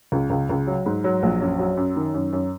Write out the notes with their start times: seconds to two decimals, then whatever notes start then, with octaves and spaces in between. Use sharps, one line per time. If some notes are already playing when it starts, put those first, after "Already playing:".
0.12 C#2
0.30 C#2
0.50 C#2
0.67 F#3
0.86 G#2
1.04 F#3
1.23 A#1
1.41 F#2
1.59 F#3
1.77 F#2
1.96 D#3
2.14 F#2
2.33 F#2